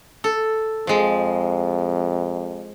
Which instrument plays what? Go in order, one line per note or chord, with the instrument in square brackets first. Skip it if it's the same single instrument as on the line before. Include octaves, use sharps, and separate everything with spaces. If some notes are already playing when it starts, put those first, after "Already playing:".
[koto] A4
[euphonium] F2 [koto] F3 G#3